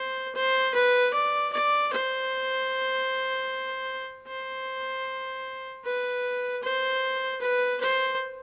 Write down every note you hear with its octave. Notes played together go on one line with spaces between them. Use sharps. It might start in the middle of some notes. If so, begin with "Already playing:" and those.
Already playing: C5
C5
B4
D5
D5
C5
C5
B4
C5
B4
C5